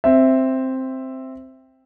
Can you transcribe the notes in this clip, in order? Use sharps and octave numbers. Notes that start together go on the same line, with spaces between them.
C4 E5